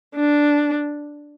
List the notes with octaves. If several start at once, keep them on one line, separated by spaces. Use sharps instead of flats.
D4